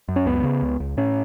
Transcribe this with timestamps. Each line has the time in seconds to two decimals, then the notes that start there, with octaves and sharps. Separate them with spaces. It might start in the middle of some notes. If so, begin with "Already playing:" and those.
0.08 F#2
0.16 C#4
0.26 C#2 B3
0.43 C#3
0.62 C#2
0.80 C#2
0.97 A2 C#4